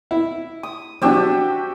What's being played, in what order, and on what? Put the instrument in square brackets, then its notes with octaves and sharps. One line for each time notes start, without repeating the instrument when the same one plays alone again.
[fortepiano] E4
[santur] D#6
[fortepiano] F3 F#3 D4 [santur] F#4 G4 E5